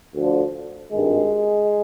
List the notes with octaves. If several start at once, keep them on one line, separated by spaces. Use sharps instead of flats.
D2 D3 F3
G#1 G2 D#3 G#3